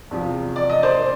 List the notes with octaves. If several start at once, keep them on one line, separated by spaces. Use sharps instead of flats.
E2 C3 F3
D5
D#5
C5 D5